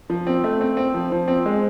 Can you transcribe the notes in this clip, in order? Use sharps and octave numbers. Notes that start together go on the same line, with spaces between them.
F3
C4
A3
C4
C4
F3
F3
C4
G#3